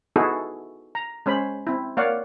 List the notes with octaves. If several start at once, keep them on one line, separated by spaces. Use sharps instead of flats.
B3 D#4 E4 F#4 G#4 A4
A#5
G#3 C#4 C5 B5
C4 E4
A#3 C#5 D5 F5 F#5